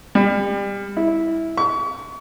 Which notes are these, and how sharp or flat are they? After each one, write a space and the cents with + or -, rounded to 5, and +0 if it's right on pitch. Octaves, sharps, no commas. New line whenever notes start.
G3 +30
E4 -10
C#6 +35